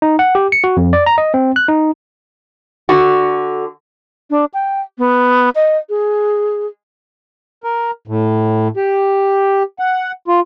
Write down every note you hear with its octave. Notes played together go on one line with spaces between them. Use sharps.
D#4
F#5
G4
C#7
F#4
F2
D5
A#5
D#5
C4
F#6
D#4
D3 F#4
D4
G5
B3
D#5
G#4
A#4
A2
G4
F#5
F4